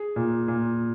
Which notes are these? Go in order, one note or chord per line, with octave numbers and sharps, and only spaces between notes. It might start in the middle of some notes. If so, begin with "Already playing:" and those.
Already playing: G#4
A#2
A#2